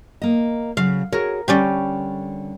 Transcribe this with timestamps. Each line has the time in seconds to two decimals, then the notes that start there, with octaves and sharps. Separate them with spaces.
0.22 A#3 D#5
0.77 C#3 F#3 F5
1.12 F#4 G#4 A#4 C#5
1.48 D3 G3 C#4 G4